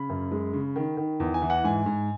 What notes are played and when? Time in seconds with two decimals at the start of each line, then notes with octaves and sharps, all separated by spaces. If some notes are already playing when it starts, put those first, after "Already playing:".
Already playing: C#3 B5
0.09 F#2
0.31 G#3
0.54 C#3
0.76 D#3
0.97 D#3
1.20 E2
1.34 G#5
1.42 E3
1.50 F#5
1.64 G#2 G#5
1.86 G#2